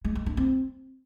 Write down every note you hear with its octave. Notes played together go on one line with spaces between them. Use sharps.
G#3
G#3
D4
C4